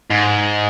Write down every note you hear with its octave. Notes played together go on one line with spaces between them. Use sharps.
G#2